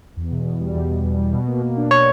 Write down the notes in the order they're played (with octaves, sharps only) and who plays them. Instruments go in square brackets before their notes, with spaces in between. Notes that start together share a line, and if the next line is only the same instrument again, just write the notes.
[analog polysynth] E2
B2
E2
G3
E2
B2
E2
G3
B2
A#3
B2
D4
[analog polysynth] B2 [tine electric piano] C#5